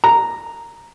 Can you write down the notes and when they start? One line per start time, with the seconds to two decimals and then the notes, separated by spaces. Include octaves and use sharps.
0.04 A#5